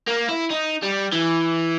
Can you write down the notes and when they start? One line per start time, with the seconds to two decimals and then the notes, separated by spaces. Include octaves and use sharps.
0.08 A#3
0.29 E4
0.51 D#4
0.83 G3
1.13 E3